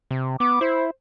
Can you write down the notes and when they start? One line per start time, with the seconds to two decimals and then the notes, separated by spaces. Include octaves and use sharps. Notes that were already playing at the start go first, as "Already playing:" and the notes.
0.11 C3
0.40 B3 D6
0.61 E4 C5